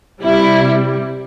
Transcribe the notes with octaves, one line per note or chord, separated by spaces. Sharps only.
C3 G3 E4